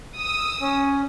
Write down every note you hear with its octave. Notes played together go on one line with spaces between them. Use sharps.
D#6 E6
C#4